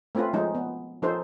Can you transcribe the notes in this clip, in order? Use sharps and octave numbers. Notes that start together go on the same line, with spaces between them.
A3 C4 C#4 F4 B4
F3 G#3 C#4 D#4
B3
F3 C#4 D#4 A4 C5